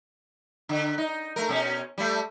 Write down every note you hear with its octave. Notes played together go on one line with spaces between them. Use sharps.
D3
D#4
A3 A#4
B2 C#4
G3 A3